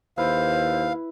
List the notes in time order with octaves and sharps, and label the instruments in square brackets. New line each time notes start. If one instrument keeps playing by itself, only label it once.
[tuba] D#2 [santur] E4 B4 [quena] C5 [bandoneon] F5